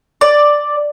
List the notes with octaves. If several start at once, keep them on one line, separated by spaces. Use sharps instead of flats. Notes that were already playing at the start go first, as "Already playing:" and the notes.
D5